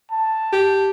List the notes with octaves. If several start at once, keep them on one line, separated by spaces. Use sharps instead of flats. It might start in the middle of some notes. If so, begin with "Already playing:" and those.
A5
G4